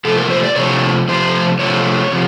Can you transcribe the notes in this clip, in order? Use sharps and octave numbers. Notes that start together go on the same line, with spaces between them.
C3 F3 A3 C4 A4
A#4
C5
D5
C3 F3 A3 C4 C#5
C3 F3 A3 C4 C5
C3 F3 A3 C4 C#5
C3 F3